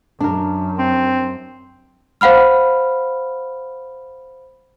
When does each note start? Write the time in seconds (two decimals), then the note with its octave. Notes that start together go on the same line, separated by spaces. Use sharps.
0.20 F#2 D4 A#4
0.78 C4
2.21 C5 F5 F#5 B5 F6